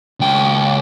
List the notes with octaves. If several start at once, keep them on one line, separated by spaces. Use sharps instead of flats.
C#2 G5